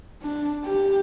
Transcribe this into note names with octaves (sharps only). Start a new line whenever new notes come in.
D4
G4